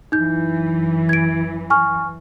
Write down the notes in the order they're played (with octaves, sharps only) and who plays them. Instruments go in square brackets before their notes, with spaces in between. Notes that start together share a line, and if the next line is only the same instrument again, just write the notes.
[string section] F#2 E3 [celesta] D#4 G6
[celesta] G#6 D7
G#5 C#6 F6